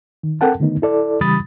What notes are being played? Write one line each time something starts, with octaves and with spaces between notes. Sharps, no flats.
D#3
C4 A4 A#4 F#5 G5 A5
D3 D#3 A3 B3 D#4
E4 A4 D5
C#3 E3 G3 B5 D#6 A6